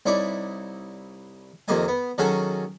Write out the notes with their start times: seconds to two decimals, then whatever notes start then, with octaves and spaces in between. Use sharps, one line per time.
0.06 C2 D#4 E4 C#5 D5 D6
1.68 F2 C3 D#3 A#3 D#5 G#5
1.88 B3
2.18 D#3 F#3 C#4 F#4 G#4 A4